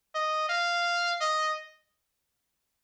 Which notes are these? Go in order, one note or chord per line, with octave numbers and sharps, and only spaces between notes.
D#5
F5
D#5